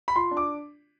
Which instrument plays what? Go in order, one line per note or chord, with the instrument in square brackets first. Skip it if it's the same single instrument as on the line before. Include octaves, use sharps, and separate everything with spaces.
[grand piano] B5
F4 C6
D4
D6